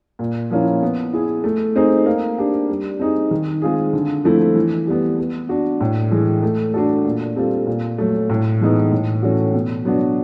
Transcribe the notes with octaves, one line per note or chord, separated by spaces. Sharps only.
A#2
F3 A#3 C#4 E4
B3
E4 G#4
A3
C4 D#4 G#4 C5
A#3
D4 G4
G3
C4 D#4 G#4
D#3
G#3 C4 F4 G#4
D3
F3 A3 C4 E4
E3
G3 B3
B3
D4 F#4
A2
E3 G#3
A3
D4 F#4 A4
A#2
G3 C4 F4 A4
A#2
F#3 A3
A2
E3 G#3 B3 D#4
A2
E3 A3 C#4 F#4
B2
F#3 B3 D4 F#4